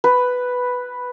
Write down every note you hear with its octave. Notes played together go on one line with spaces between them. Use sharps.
B4